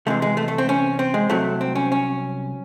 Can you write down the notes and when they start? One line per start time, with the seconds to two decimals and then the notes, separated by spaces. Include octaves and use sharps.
0.06 C2 C3 E3 G#3 A3
0.22 G#3
0.37 A3
0.48 A3
0.58 C4
0.69 C#4
0.99 C4
1.14 G#3
1.30 C2 C3 F#3 A3
1.61 C4
1.75 C#4
1.92 C#4